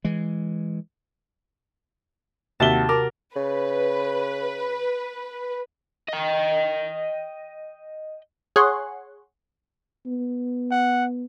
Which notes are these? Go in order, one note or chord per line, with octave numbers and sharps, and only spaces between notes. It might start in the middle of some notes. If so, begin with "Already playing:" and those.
E3 G#3
D#2 C3 F#4 G4 E5 A5 G7
A#4 D6
C#3 B4
D#5 G5
G#4 C#5 F#5 C6
B3
F#5